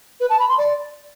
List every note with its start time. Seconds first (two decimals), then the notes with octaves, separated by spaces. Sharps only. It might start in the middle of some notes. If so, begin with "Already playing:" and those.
0.20 B4
0.30 A5
0.39 B5
0.49 C6
0.58 D5